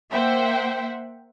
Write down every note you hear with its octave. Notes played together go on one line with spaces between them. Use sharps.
A#3 C5 E5 F#5 G5